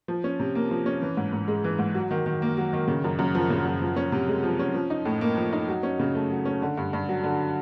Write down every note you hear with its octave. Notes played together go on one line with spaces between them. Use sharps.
F3
C#4
C3
A#3
F3
C#4
E3
G#2
G#2
G#3
E3
G#2
F#3
D#3
D#3
A#3
F#3
D#3
C#3
F#2
F#2
F3
C#3
F#2
F3
C#4
C3
G#3
F3
C#4
F3
D#4
A2
A#3
F3
D#4
F#3
C#4
C#3
A3
F#3
C#4
D3
G2
G2
F#3
D3